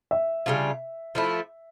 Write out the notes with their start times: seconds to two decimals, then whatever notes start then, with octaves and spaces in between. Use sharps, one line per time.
0.11 E5
0.46 C#3 G3 D4 F4
1.15 F3 A3 E4